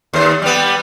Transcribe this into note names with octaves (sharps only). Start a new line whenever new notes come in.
D#2 C5
G3 B3